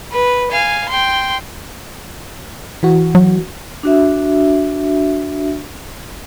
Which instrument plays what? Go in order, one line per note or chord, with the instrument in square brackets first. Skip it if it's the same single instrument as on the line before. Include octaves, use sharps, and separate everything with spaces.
[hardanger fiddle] B4
F5 G#5
G5 C6
[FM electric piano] E3 F#4
[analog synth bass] F#3
[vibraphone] D4 F#4 E5